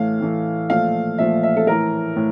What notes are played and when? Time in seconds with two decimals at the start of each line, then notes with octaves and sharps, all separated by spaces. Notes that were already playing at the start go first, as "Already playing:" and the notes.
Already playing: A2 E3 A3 F5
0.20 A2 E3 A3
0.70 A#2 F3 A3 F5
1.18 A#2 F3 A3 E5
1.43 E5
1.57 A4
1.67 A2 E3 A3 A#4
2.16 A2